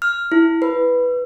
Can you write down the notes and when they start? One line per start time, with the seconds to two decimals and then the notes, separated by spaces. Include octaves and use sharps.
0.02 F6
0.32 E4
0.62 B4